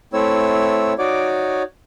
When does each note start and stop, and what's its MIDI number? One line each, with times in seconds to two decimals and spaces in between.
0.13 0.94 57
0.13 0.94 60
0.13 0.94 64
0.13 0.94 73
0.13 0.94 88
0.99 1.63 63
0.99 1.63 66
0.99 1.63 73
0.99 1.63 74
0.99 1.63 86